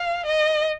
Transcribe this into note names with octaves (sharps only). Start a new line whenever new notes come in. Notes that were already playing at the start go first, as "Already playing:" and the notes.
Already playing: F5
D#5